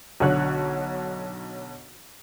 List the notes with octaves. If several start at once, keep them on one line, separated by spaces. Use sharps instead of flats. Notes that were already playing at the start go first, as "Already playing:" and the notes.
B1 D3 C#5 F#6